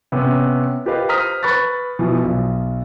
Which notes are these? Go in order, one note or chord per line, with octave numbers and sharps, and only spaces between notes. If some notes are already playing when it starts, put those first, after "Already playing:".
C3 B3 C#4
F4 G4 A#4 B4 D#5 F5
C5 A#5 D#6 F6 B6
B4 B5 C#6 F#6 A6
B2 E3 F3
B1